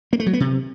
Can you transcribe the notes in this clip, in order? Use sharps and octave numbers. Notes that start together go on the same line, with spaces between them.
A#3
A3
F#3
B3
C3